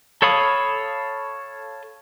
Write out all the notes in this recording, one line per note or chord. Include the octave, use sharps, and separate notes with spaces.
A4 C#5 F5 B5 D#6